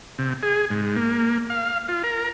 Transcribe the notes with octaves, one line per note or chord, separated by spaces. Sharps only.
C3
G#4
G#2
A#3
F5
F4
A#4